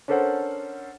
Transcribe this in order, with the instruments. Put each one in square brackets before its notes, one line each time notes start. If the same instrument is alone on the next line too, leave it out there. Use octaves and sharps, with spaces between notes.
[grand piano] C#4 D4 A4 A#4 C5 F#5